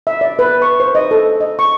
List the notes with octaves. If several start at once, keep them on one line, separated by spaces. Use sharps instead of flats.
E5
D5
B4
C#6
C5
D#5
A4
D#5
C#6